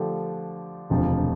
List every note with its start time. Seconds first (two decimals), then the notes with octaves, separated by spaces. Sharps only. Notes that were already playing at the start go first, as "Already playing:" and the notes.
Already playing: D3 F3 A3 D4 G4
0.90 E1 D2 C3 F3